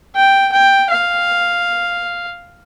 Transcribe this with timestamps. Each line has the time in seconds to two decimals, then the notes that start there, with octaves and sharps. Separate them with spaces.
0.15 G5
0.52 G5
0.90 F5